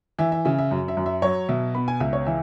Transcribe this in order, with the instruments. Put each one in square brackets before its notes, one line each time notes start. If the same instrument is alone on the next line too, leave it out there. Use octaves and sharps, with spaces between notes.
[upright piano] E3 E5
E5
C#3 E5
E5
F#2
E5
F#2
E5
F#3 C#5
B2 E5
B3 B5
G#5
C#2 E5
C#5
E3 E5